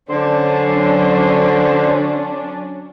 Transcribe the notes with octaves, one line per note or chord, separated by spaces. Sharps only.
D3 F#3 C#4 D4 C5 D5